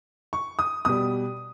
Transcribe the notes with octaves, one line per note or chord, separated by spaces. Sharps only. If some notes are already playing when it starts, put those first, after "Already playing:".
C#6
D#6
B2 G3 D#6